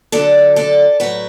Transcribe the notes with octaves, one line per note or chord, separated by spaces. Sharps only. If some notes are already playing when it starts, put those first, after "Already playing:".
D2 D3 F#3 A4 D5
A4 D5
A2 F#3 F#4 B4